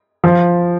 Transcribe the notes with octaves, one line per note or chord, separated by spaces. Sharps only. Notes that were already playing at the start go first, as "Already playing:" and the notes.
F3